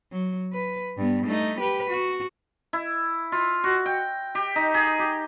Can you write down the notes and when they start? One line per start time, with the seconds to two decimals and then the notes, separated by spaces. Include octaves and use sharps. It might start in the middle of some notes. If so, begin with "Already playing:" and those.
0.12 F#3
0.53 B4
0.97 G2 B3
1.27 A3 D#4
1.60 G4 B4
1.90 F#4
2.73 E4
3.32 F4
3.64 F#4
3.86 G5
4.35 G4
4.56 D#4
4.74 G#4
4.99 G4